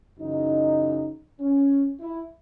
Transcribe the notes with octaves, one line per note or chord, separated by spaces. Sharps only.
F#2 C#3 E3 D#4
C#4
E4